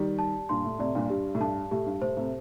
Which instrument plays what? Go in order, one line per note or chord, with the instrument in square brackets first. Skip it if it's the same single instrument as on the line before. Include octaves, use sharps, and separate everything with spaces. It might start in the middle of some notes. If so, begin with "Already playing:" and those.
Already playing: [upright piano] D#3 G3 [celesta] G4 D5
[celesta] A5
[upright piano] G2 A#2 [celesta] C6
[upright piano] A2
[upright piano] A2 C3 [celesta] D5
[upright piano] G2 A#2
[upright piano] G2 [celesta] G4
[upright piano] A2
[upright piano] G2 [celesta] A5
[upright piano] A2 [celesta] G4
[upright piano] G2
[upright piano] A2 [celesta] C5
[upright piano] A2 C3